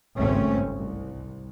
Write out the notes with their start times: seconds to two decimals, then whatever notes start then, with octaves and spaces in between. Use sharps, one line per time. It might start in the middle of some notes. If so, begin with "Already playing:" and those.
0.16 G#1 C#2 G2 A3 C4 C#4
0.75 C2